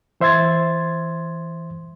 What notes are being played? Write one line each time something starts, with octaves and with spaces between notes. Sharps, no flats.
E3 C5 E5 C6 G#6 A6